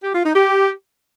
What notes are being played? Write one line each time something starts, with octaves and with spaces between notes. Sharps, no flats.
G4
F4
D#4
G4